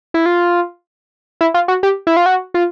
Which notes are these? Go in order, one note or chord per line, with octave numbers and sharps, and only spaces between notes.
E4
F4
E4
F4
F#4
G4
E4
F4
F#4
F4